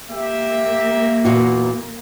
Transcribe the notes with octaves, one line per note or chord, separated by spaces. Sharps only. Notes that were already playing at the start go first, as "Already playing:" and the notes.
A#3 G4 E5
E2 A#2 F#4